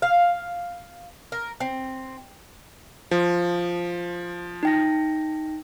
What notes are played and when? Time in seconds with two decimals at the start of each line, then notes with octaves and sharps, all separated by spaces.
0.02 F5
1.32 A#4
1.60 C4
3.11 F3
4.63 D#4 G5 A#6